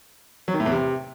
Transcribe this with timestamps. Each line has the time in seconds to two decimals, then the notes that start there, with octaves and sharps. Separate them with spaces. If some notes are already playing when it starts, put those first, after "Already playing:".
0.48 F#3
0.54 D#3
0.60 A2
0.66 E2
0.72 C3